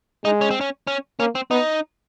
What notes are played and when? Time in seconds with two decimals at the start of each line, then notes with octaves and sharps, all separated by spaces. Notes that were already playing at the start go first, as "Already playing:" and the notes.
0.25 G#3 D#4
0.41 C#4
0.51 C4
0.61 C#4
0.87 C#4
1.19 A#3 C#4
1.35 C4
1.50 B3 D#4